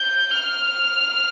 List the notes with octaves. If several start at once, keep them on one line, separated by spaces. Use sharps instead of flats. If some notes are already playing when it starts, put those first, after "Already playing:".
Already playing: G6
F6